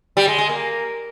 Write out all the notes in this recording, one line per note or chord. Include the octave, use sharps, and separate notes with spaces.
G3
G#3
G#3
A#3